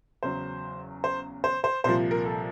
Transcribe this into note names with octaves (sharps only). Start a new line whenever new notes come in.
E2 C#3 F#3 C5
C5
C5
C5
C2 A#2 F3 C5
A#4
A4